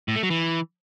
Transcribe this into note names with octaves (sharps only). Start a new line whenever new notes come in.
A2
A3
F#3
E3